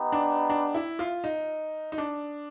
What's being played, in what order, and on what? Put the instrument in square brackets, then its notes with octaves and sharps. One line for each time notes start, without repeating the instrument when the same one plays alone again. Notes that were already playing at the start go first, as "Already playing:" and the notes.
Already playing: [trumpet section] B3 D#4 G4
[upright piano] D4
D4
E4
F4
D#4
D#4
D4